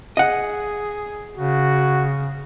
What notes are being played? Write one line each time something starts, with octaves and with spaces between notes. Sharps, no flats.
G#4 D#5 F#5
C#3 F#4